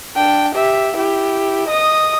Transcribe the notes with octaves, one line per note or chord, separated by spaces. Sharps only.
D4 G5
G4 E5
E4 G4
D#5 D#6